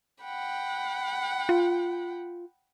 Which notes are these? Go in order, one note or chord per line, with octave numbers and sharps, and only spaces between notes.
F#5 G5 B5
F4